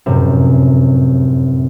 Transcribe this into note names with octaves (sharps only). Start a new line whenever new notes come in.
F1 F#2 A2 C3